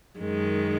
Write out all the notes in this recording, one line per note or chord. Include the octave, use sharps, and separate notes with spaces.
F#2 D#3 G#3